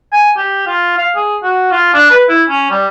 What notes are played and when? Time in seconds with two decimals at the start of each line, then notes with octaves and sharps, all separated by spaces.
0.12 G#5
0.37 G4
0.67 F4
0.97 F5
1.16 G#4
1.43 F#4
1.71 F4
1.94 D4
2.10 B4
2.29 E4
2.49 C#4
2.71 G3